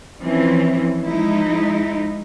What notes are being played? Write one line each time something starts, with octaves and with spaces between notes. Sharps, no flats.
E3 F3 C4 C#4
F3 G#3 D#4 E4